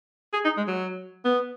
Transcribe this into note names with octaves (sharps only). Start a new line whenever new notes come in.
G#4
D#4
G#3
F#3
B3